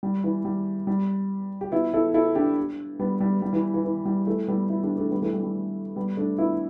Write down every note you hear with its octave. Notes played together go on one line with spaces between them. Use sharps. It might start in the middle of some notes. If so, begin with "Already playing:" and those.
G3
E3
G3
G3
G4
B3 E4
E4 A4
E4 A4
D4 G4
G3 B3
G3
G3
E3
E3
E3
G3
E3 A3
G3 B3
B3 E4
D4 G4
A3 D4
G3 B3
E3 A3
G3
G3
G3 B3
A3 D4
B3 E4